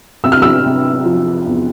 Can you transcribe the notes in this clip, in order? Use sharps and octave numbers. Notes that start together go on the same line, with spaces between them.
C3 E6
F6
E6
C3
F3
E2